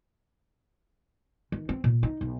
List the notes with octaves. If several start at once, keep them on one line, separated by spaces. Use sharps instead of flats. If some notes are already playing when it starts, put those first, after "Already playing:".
D#3
C4
A#2
D#4
B1